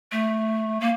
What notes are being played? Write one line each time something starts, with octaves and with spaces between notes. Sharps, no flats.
A3
A#3